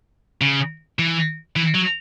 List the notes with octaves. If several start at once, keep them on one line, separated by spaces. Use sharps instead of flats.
C#3
E3
E3
F#3